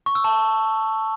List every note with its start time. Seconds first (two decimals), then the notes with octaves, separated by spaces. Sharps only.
0.06 C#6
0.15 E6
0.24 A5